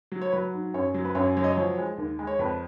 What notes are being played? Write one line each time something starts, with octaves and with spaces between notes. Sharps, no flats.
F#3
C#5
F#3 B4
G#2
F#2 C#5
F#3
B4
F#2 C#5
F#3 C#5
D#5
C#5
F3
G#3
D#2
G#3
C#5
F2 B4